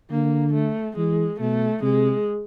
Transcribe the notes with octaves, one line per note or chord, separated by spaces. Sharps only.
D3 A#3
A3
E3 G#3
B2 A3
C3 G#3